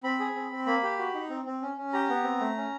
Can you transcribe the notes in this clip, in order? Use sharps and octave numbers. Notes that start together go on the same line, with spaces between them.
C4 B5
G#4
C4
C4
A#3 B5
G4
F#4
D#4
C4
C4
C#4
C#4
G4 A#5
B3
C4
A3
C#4